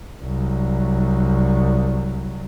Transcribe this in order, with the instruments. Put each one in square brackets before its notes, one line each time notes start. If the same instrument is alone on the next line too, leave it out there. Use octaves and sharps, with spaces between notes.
[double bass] C2 F#3